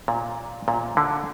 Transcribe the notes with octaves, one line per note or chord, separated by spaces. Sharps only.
A#2
A#2
D3